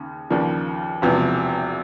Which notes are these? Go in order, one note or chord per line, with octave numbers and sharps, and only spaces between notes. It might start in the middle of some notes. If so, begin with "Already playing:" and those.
Already playing: D#2 C#3
D#2 C#3 F3 A#3 D4
E1 E2 C3 F3